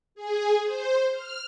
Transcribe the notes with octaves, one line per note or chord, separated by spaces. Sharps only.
G#4
C5
F6